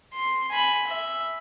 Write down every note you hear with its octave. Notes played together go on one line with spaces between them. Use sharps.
C6
G#5 B5
E5